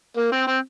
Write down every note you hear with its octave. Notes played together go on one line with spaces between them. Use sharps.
A#3
C4
C4